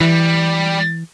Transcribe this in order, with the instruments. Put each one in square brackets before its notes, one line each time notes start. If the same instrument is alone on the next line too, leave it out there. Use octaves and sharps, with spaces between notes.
[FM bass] E3 [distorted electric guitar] G3